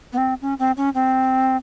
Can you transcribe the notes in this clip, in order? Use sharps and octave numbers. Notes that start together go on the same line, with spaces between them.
B3
C4
C#4
C4
C#4
C4